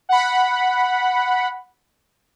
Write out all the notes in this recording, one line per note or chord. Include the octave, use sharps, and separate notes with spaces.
F#5 B5